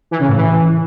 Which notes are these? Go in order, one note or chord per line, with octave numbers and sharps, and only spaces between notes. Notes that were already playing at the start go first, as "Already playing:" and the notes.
E3
C#3
A2
E3